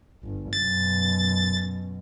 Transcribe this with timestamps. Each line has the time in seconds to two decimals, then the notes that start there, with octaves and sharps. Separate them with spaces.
0.24 G1
0.53 F#2 B2 A6